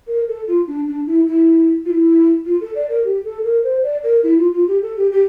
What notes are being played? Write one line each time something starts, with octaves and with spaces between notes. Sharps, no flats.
A#4
A4
F4
D4
D4
E4
E4
F4
E4
F4
A4
D5
A#4
G4
A4
A#4
C5
D5
A#4
E4
F4
F4
G4
A4
G4
G4